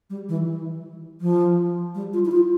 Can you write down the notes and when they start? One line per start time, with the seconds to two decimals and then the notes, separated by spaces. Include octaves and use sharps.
0.10 G3
0.29 E3
1.21 F3
1.95 G3
2.13 F4
2.25 E4
2.31 F4